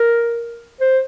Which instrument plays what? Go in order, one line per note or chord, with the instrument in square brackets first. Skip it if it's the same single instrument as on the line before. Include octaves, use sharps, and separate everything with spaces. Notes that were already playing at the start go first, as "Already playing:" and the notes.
Already playing: [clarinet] A#4
C5